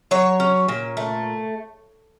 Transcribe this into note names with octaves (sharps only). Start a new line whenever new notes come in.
F#3 C#5
C#4
A#2
A3